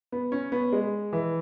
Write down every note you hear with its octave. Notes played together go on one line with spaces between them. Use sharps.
B3
C#4
B3
G#3
E3